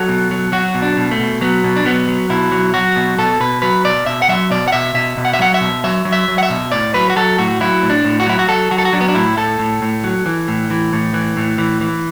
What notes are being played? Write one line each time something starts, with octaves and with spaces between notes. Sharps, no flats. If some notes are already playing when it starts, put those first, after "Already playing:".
Already playing: F#3 A4
B2
F#3
F#3 F#4
B2
D4
B2
A3
B2
F#3 B3
B2
D4
F#3 B3
F#3
B2 E4
F#3
F#3 F#4
B2
B2 A4
B2 B4
F#3 B4
B2 D5
B2 E5
F#5
F#3 E5
B2 D5
F#5
B2 E5
B2 E5
B2
F#5
E5
F#3 F#5
E5
B2
F#3 E5
F#3
E5
F#3
F#5
E5
B2
A2 D5
F#3 B4
F#4
F#3 A4
A2 F#4
F#3 E4
A2
D4
A2
F#4
F#3 E4
F#4
F#3 A4
F#3 F#4
A4
F#4
F#3 D4
B3
D4
A2 E4
A2 A4
A2
A2
F#3
E3
A2
E3
A2
E3
A2
E3
E3